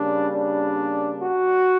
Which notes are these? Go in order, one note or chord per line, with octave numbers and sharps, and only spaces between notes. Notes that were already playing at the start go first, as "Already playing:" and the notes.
Already playing: C#3 G3 A#3 D4
D4
F#4